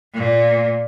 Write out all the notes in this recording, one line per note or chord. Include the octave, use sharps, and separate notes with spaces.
A#2